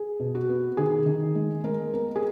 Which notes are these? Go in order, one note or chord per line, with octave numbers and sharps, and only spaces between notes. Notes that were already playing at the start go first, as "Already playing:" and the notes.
Already playing: G#4
B2
F#4
B3
D#3 G#4
D#3
G#3
G#3 A#4
B3 A#4
G#4